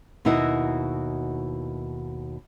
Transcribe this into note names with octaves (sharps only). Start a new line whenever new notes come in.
D#2 B2 D#4 E4 F#4 D#5